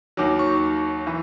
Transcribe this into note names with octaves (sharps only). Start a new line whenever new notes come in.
D#2 D#3 F#3 D6
C#6
E3